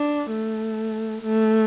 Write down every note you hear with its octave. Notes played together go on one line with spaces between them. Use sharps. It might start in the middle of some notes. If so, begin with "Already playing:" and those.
Already playing: D4
A3
A3